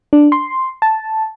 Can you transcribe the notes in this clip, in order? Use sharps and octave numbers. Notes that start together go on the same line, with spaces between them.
D4
C6
A5